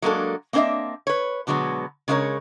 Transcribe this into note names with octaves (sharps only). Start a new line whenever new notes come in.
F#3 G#3 A#3 D4 A4
A#3 C4 D4 C5 D#5 E5
B4 C#5
B2 D3 F#3 G#3 B3
C#3 G#3 B3 E4 A#4 C#5